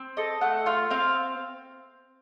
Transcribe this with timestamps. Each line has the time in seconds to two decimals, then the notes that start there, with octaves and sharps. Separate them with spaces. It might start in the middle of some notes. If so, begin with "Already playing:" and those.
Already playing: C4
0.17 A4 D#5
0.41 A3 F#5
0.66 F4 F5
0.90 C4 F5